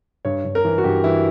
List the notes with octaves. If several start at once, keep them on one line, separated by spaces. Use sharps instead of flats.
G2 C#5
G2
A#4
E3
F#4
G2 G4
E3 E4